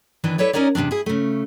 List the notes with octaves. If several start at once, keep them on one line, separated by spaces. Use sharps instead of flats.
D#2 D#3 E3 D4
E4 A4 B4 C#5 D5
C#4 D#4 A#4 C#5 D5
E2 C3 F#3 C4 D4
E4 G#4
C#3 A3